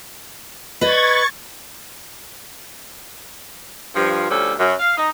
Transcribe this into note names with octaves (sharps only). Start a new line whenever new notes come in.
B4 D#5 C#6 G#6 A6
G2 F3
D2 F3 G3 C#4 A4
F#2
F5
D#4